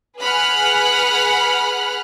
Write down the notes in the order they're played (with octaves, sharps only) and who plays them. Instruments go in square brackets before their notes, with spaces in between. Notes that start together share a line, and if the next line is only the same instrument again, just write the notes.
[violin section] G#4 B4 F#5 B5 F6 F#6